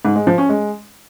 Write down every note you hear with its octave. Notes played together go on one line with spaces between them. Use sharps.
G#2
G#3
F3
C#4
G#3